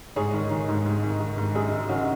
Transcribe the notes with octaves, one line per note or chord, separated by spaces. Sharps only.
G#2 G#4 C#5
D#3
D#3
G#2
G#2
D#3
D#3
G#2
F#2 D#4 G#4
D#3
D#3 C#4 F#4